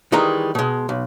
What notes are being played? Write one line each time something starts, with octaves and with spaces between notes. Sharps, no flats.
D#3 E3 G3 G#3 A#5
B2 G#3
B1